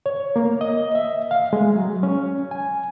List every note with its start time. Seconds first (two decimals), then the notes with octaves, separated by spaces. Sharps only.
0.06 C#5
0.36 A#3
0.61 D#5
0.95 E5
1.31 F5
1.53 G#3
1.75 F#3
2.03 C#4
2.51 G#5